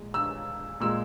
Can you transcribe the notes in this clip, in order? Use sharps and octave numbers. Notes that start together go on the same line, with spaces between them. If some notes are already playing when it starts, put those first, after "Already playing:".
Already playing: A#2 G#3
E6
A#2 G#3 E6